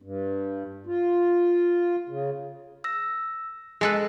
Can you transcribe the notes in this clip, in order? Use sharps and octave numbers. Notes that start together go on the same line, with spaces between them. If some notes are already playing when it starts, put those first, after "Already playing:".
G2
F4
C#3
E6 A#6
G#3 G#4 A4 B4